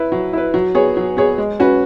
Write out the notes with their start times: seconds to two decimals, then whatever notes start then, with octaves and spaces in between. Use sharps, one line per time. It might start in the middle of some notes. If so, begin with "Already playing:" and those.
Already playing: E4 B4
0.12 F#3
0.33 E4 B4
0.54 F#3
0.75 B3 G#4 C#5
0.97 F#3
1.17 B3 G#4 C#5
1.38 G#3
1.60 C#4 F#4 B4